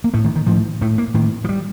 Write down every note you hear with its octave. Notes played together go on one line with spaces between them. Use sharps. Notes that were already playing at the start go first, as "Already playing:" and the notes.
A#3
A2 A3
D#3
D#3
A2 F3
A2 A3
A#3
A2 D#3
F3
G3